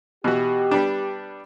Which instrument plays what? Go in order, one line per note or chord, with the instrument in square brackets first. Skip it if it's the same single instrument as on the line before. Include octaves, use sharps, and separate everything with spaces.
[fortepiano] B2 E3 F#4 [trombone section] G4
[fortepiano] G3 B3 D4